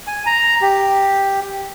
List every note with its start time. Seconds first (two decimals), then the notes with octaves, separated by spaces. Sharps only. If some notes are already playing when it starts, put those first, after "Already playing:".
0.07 G#5
0.26 A#5
0.62 G4